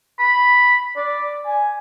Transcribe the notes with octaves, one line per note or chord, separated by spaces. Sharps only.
B5
D5
G#5